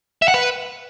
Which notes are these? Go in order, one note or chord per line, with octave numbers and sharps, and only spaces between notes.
E5
F#5
B4